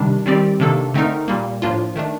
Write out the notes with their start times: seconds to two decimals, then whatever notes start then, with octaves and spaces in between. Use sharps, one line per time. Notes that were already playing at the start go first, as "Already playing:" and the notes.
Already playing: C3 D#3 G3 D4
0.26 D#3 G3 C4 G4 D5
0.60 C3 D#3 A#3 D4 A4
0.94 D3 A3 C4 D#4 A#4
1.28 A#2 G3 A#3
1.62 A2 F3 A#3 D4 F4
1.96 D#3 A3 D4